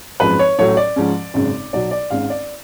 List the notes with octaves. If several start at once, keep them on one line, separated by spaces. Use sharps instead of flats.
G#1 F#2 F3 G#3 B4
C#5
A1 A2 F#3 A3 C#5
D5
G#2 F3 G#3 C#4
G#1 F#2 C#3 G#3 C#4
B1 B2 F#3 D5
D5
G#1 G#2 G#3 C#4 F5
D5